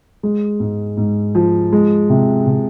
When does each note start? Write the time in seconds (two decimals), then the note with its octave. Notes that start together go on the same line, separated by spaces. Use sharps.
0.23 G#3
0.60 G#2
0.97 G#2
1.35 F3
1.73 G#3
2.10 C3
2.47 C3